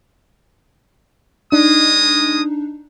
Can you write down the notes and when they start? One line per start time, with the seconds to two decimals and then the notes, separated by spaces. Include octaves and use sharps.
1.52 G#3 D4 D#4 D#6